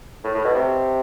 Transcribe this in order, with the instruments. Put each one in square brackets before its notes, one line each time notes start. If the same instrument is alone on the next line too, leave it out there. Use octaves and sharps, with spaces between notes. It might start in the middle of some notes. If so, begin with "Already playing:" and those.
[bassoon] A2
A2
B2
C3